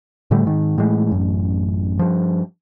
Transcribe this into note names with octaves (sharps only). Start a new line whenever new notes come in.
A2 D3 G3 A3
G#2 D#3
A2 E3 G#3
A1 F#2
G2 F3